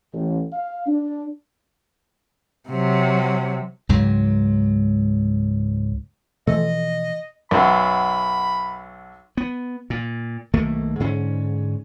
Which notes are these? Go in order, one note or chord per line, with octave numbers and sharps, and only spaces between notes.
A1
F5
D4
C3 F#3
C#2 G#2 F#3
B2 E3 F3 A3 D#5
B1 F#2 B5
B3
A#2
B1 D#3 A3 A#3
G#2 D3 C#4